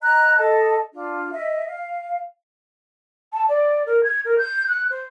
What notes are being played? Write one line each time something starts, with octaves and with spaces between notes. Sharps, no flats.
D#5 A#5 F#6
A4 D#5 A5
D4 F4
D#5 E5
F5
A5
D5
A#4
G#6
A#4
G6
F#6
C5